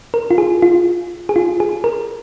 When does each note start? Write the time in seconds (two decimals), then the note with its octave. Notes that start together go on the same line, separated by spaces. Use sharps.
0.14 A#4
0.31 F4
0.38 G#4
0.62 F4
1.29 G#4
1.36 F4
1.60 G#4
1.84 A#4